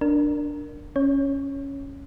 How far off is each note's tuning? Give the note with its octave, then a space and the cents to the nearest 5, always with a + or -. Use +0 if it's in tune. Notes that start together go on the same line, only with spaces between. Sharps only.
D4 +0 A#4 +0
C#4 +0 C#5 +0